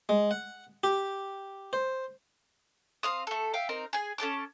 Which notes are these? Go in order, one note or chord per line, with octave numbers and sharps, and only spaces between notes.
G#3
F#5
G4
C5
C4 F5 D#6
A3 A4
E5 F5 G5
C4 D#4 A#4
G#4 G#5
C#4 A4 A5 D6